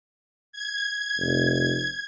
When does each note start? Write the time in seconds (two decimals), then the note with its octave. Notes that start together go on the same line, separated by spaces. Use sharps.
0.52 G#6
1.18 F1